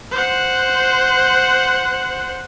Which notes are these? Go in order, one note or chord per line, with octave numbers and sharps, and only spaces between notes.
C5 F#5